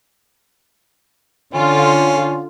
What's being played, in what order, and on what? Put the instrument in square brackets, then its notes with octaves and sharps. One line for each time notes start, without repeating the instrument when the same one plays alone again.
[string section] D3 F4 [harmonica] C#4